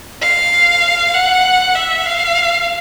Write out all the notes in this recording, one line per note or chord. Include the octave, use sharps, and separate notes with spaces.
F5
F#5
E5
F5